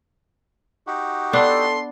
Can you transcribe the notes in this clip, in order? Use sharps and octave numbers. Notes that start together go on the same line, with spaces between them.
D#4 F#4 G4
B3 D4 A4 C6